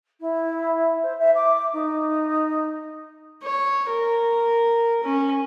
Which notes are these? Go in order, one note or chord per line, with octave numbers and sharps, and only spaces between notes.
E4
C5
E5
D6
D#4
C#5
A#4
C#4